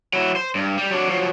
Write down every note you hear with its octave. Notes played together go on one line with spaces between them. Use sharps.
F#3 E4
C5
G2
G3
F#3 D4
F3 F#3